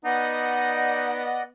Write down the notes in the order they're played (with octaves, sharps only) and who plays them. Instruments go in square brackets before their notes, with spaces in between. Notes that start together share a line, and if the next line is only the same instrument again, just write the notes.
[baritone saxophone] B3 [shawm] D#4 [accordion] D5 D#5 F#5